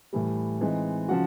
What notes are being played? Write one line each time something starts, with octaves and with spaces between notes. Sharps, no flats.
A2 E3 G3
E3 G#3 C4 D#4
C#3 F3 F#4 F#5